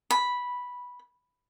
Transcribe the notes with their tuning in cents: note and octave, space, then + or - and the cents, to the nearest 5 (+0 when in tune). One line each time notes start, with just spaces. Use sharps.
B5 -5